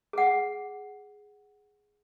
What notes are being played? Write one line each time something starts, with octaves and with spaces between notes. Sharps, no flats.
G#4 F#5